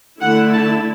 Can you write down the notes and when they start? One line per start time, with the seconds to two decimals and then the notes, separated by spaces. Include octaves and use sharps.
0.21 D3 A3 E4 F#5
0.53 A5